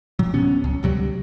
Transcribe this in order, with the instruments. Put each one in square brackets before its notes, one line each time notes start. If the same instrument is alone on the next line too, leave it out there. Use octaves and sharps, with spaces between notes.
[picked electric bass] A2 F#3
D1 C3 B3 C#4
C#2
D2 C3 F#3 G3